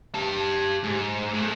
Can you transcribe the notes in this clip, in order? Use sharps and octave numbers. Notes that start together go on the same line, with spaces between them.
G4 A5
G#2
G#3 A3